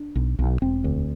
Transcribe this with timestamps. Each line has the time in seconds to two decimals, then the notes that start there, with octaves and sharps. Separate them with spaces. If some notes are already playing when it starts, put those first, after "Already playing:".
Already playing: D4
0.15 B1
0.39 B1
0.62 E1 C4
0.84 D2